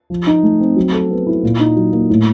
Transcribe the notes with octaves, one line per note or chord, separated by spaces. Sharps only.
F3
D#4
A3
C4
F#3
A4
B3
E4
A#2
D#4
F#3
A#3
A2